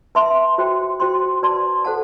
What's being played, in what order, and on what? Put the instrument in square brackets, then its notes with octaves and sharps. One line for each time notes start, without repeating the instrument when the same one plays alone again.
[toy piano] B4 E5 A5 C6
F#4 C5 G5
F#4 C5 G5 C6
F#4 B4 D5 A5 C6
A4 C5 F#5 A5